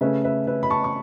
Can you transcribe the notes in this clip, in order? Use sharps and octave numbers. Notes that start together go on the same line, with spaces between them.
C#3 A3 C#4 B4 E5
B4 E5
B4 E5
B5
A5 C#6
C#6